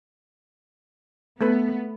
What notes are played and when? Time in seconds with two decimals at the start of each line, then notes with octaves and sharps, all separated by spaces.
1.41 A3 B3 A4 B4